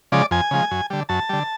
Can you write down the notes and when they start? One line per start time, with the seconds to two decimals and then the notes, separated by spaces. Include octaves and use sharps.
0.12 C#3 F3 G#3 D5
0.31 F2 G#5
0.51 C#3 F3 G#3
0.71 F#2
0.90 D3 G3
1.09 F#2 A5
1.29 D3 G3